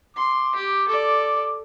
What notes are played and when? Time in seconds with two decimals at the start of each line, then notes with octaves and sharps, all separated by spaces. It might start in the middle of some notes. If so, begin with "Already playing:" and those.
0.17 C6 D6
0.55 G4
0.88 A4 D5